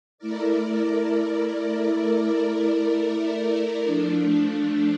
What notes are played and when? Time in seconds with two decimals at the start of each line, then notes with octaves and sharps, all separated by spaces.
0.18 A3 E4 A#4 D5
3.84 F3 A3 D4